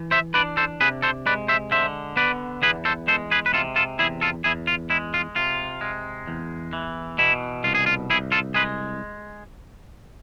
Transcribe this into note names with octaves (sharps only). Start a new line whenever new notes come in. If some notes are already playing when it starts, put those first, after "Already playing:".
Already playing: E3
C5 E5
D4 B4 D5
A4 C5
C3 G#4 B4
A4 C5
G#3 B4 D5
C5 E5
D3 C5 E5
B3 B4 D5
E2 G#4 B4
A4 C5
G#3 A4 C5
G#4 B4
B4
C3 F4 A4
F4 A4
E2 E4 G#4
F4 A4
E2 E4 G#4
F4
G#3 E4
F4
C3 F4
G#3
E2
E3
B2 E4
C2 F4
G#4
F4
C2 E4 G#4
F4 A4
G#3 G#4 B4